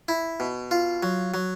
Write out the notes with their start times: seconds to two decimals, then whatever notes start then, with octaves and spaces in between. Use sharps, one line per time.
0.08 E4
0.40 B2
0.71 F4
1.03 F#3
1.34 F#3